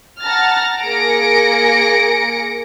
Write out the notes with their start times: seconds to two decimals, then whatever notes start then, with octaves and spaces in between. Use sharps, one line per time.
0.22 F#5 A5 A#5 F6 A6
0.84 A#3 G#4 A#6 C#7 D7